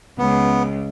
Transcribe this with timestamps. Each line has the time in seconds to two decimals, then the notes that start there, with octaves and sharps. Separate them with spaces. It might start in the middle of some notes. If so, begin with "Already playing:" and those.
0.18 C#2 B3